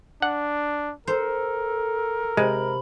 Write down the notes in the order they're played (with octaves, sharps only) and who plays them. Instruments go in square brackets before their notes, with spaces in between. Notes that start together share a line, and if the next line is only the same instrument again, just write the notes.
[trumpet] D4 [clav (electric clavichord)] F#5
[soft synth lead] A4 [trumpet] A#4 [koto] C5
[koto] C3 [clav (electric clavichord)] G#3 [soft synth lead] B5